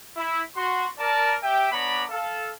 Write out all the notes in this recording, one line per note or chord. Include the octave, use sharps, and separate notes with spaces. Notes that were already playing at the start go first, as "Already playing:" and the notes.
E4
F#4 C6
A#4 D5 A5
G4 E5 G5
B3 D4 C#5 D5 A#5 B5
A4 F5